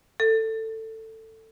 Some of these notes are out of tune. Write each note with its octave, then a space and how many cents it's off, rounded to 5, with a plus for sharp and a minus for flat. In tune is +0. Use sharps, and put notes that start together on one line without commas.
A4 +15